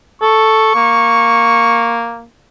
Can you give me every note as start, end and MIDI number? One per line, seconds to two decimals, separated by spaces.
0.22 0.72 69
0.22 2.08 85
0.75 2.25 58